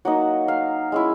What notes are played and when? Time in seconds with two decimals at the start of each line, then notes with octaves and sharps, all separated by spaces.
0.05 F#3 A#3 D#4 F#5
0.48 F5
0.92 G#3 C#4 E4